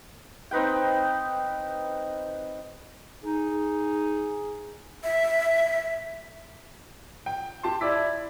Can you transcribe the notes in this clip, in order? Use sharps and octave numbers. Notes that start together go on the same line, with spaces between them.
C4 D#4 B4 G5
D#4 G#4
E5
G5
G4 A5 C6
E4 D5 D6 B6